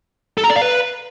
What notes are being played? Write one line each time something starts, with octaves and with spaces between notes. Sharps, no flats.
A4
A#5
D5
F5
B4